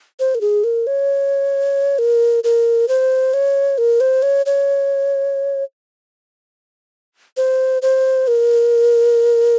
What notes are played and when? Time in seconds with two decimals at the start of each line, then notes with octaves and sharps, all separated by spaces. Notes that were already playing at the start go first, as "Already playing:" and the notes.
0.20 C5
0.35 A#4
0.41 G#4
0.64 A#4
0.87 C#5
1.99 A#4
2.44 A#4
2.88 C5
3.34 C#5
3.78 A#4
4.00 C5
4.22 C#5
4.46 C#5
7.37 C5
7.82 C5
8.28 A#4